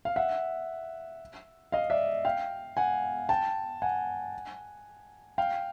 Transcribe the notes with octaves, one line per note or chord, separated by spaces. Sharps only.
F5
E5 F#5
D#5 F5
D5 E5
F5 G5
F#5 G#5
G5 A5
F#5 G#5
F5 G5